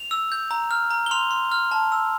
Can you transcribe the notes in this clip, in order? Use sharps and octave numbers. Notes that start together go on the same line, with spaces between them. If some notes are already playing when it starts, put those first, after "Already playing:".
Already playing: F7
E6
G6
A#5
F6
A#5
G7
C6 F7
C6
F6
A5
E6